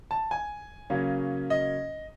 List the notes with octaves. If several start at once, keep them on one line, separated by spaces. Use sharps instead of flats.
A5
G#5
C#3 F#3 A#3 C#4
D#5